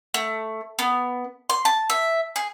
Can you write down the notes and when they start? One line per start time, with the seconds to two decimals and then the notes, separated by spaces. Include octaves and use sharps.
0.14 A3
0.79 B3
1.50 C6
1.65 A5
1.90 E5
2.36 G#4